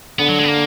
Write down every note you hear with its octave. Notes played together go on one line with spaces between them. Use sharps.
D3 B3
F#3
G#3
B3
A#3